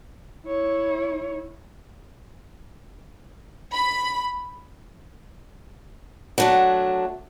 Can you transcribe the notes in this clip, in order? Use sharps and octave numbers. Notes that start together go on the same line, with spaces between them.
E4 C#5
B5
F#3 A3 D4